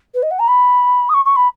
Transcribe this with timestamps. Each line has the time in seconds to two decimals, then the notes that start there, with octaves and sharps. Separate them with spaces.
0.14 B4
0.22 D#5
0.31 F#5
0.39 A#5
0.48 B5
1.09 D#6
1.14 C#6
1.25 C#6
1.36 B5